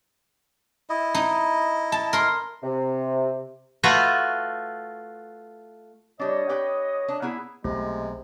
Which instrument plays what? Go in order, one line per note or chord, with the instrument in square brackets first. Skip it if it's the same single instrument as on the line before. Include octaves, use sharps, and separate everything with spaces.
[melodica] E4 D#5
[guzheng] D#4
A5
A#4 C6
[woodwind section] C3
[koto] A3 F4 F#4 B4
[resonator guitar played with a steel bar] G3 D4 [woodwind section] C#5 D#5
[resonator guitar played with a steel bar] G4 B4 G5
D4
B3 E4 G#4
[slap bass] B1 [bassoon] C3 [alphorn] G#3 [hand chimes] A3